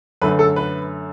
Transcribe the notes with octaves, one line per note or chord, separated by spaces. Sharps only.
F#2 D3 A3 B4
A4
B4